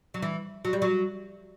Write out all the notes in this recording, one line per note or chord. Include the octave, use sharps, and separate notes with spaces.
F#3
E3
F#3
G3
F#3